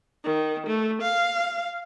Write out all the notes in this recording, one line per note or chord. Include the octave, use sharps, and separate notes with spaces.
D#3
A3
F5